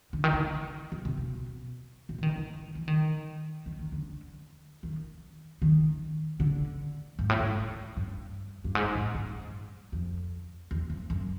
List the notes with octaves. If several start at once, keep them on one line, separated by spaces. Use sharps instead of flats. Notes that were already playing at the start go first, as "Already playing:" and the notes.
D3
D#3
D3
C#3
C3
B2
B2
E3
D#3
E3
E3
D#3
D#3
D#3
D3
D#3
D#3
D3
G#2
A2
G#2
G2
G2
G#2
A2
G2
F2
E2
F2
F#2